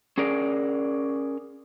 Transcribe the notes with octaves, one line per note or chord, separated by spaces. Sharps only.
C#4 G#4 A#4 D5